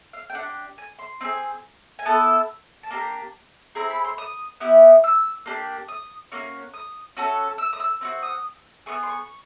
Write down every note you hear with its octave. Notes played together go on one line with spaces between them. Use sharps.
F5
G5
D4 G4 F#5
G#5
C6
C4 D#4 G#4
G#5
B3 E4 A4 A5
A5
A#3 D4 G4 A#5
C4 E4 G#4 A#5
B5
C6
D#6
B3 E4 G4
E6
A#3 D4 G4
D#6
A#3 C#4 F#4
D#6
C#4 F#4 A4
E6
D#6
E6
C4 D#4 F#4
D#6
B3 E4 G#4 C#6
C6
C#6